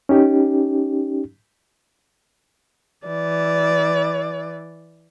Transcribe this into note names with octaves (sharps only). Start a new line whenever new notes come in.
C#4 D#4 G4
E3 D5